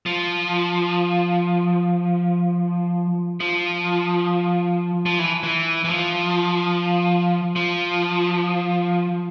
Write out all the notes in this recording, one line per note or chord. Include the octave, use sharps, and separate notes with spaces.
F3
F3
F3
E3
E3
E3
F3
F3